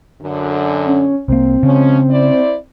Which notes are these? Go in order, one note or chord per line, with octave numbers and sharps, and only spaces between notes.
F#2 D3
C#4
C2 A#3 C4
C#3 F3 G#3 C#4
E4 C5 D5